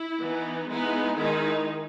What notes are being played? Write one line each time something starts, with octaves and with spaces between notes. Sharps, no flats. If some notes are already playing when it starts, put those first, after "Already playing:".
Already playing: E4
E3 B3 D#4
G#3 B3 D#4 E4
D#3 G#3 D#4 E4